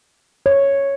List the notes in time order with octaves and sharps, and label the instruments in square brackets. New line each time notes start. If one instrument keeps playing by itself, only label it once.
[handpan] C#5